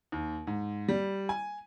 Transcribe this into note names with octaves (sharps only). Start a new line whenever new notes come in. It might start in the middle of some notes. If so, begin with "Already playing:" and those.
D#2
G#2
G3
G#5